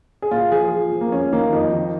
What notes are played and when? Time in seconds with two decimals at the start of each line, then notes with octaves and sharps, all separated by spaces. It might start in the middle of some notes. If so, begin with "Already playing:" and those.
0.22 G#4
0.31 A#2 F4
0.52 F3 G#4
0.72 F3
0.92 F3
1.01 A#3
1.12 F2 C#4
1.32 D#3 A#3
1.53 F2 D#4
1.73 D#3